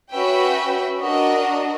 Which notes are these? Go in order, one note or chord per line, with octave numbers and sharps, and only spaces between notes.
C#4 F#4 B4 E5 G5
D4 F#4 A#4 D#5